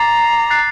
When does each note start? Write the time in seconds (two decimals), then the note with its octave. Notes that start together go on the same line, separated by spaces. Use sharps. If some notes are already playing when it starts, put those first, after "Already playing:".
Already playing: A#5 D6 A6 C7
0.50 F#6 A6 C7